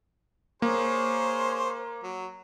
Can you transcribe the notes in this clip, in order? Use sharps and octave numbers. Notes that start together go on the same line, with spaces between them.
A#3 G#4 C5 C#5
F#3